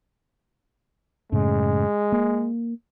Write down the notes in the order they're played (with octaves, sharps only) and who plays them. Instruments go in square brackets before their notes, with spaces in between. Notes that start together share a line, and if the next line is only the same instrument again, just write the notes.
[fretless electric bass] F#2 A2 C#3 [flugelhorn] G#3
[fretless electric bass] A#3